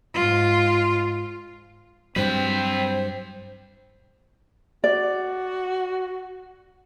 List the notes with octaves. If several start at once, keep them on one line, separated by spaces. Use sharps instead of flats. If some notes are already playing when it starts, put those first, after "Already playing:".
G#2 F4
G2 F#3 C4 B4 C5 G5
F#4 D5